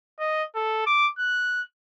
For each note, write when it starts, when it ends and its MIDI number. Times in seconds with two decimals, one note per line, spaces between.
0.20 0.43 75
0.55 0.82 69
0.86 1.09 86
1.19 1.63 90